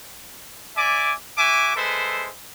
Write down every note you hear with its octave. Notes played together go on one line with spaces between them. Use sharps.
D5 E5 G#5 D6
F#4 E5 G#5 D6
G#3 A4 B4 C5 E5